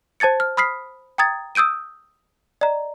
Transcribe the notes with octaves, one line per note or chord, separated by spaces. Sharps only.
C5 A5 G#6 A6 C#7
F6
B5 D#6 F6 B6 C7
G5 A#5 D#6 G#6 A6
D#6 E6 G6 D7 D#7
D5 D#5 A#5